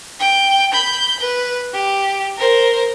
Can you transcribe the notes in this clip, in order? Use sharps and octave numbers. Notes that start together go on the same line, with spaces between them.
G5
B5 G6
B4
G4
A#4 C5